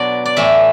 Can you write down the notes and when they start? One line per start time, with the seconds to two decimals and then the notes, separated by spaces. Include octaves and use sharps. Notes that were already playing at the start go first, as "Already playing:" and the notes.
Already playing: B2 F#3 B3 D4 D5
0.25 D5
0.37 A2 E3 A3 E5